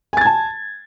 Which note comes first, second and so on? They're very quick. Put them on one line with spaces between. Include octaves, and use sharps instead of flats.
G#5 A6 G#6 A5